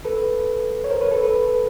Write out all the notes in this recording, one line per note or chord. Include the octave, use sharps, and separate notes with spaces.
A4 B4
C#5
A#4 C5
B4 C#5
A4 B4
A4 B4